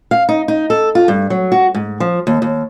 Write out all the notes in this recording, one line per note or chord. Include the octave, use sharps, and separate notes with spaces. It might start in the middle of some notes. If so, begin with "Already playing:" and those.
F5
D#4
D#4
A4
F4
G2
F#3
F#4
G#2
F3
D#2
D#2